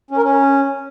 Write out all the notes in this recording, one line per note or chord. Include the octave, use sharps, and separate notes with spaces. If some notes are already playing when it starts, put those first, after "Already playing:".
C#4
A#4
C#4